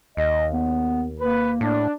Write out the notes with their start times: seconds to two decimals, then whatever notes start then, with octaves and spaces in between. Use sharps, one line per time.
0.17 D#2 D#5
0.52 B3
1.21 A#3 B4
1.61 A2 D4